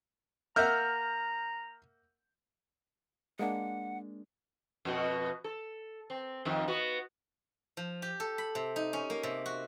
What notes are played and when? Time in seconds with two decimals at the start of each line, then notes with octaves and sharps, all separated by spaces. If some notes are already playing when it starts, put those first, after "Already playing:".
0.56 A#3 E5 F#5 A#5 F6 G6
3.39 G#3 A#3 D4 F#5
4.85 F2 B2 F#4
5.44 A4
6.10 C4
6.45 F2 D#3 F3
6.68 B3 F#4
7.77 F3
8.02 G4
8.20 A4
8.38 B5
8.55 C3
8.76 D#4
8.93 C#4
9.10 A#3
9.23 C3
9.46 F#4